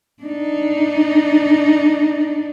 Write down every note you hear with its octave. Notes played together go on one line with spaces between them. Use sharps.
D4 D#4